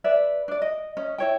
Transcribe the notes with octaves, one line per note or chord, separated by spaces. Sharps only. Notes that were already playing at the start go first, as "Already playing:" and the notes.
B4 D5 E5
D4 D5
D#5
C#4 D#5
E4 C#5 G5